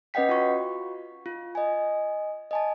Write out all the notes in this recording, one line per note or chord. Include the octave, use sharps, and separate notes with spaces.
C#4 B4 D#5 F#5 G5 B6
F4 F#4 C#6
F4
D#5 G#5
D#5 G#5 A5